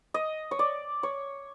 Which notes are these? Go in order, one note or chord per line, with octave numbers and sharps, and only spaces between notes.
D#5
C#5
D5
C#5